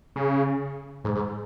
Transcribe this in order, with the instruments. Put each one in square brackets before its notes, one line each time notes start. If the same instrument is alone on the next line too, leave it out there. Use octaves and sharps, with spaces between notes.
[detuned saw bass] C#3
G#2
G#2